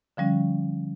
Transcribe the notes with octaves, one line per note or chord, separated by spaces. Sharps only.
D3 F3 G3 C#4